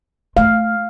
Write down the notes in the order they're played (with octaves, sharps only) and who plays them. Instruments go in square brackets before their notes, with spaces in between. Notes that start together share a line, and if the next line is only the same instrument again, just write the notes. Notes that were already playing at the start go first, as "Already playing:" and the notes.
[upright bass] A3 [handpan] F5